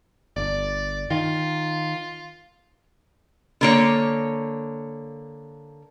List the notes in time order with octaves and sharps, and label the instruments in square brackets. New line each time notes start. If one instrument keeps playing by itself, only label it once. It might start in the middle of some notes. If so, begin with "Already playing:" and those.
[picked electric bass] G1 [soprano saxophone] D5
[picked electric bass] D#3 [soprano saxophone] F4
[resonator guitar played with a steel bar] D3 A#3 C#5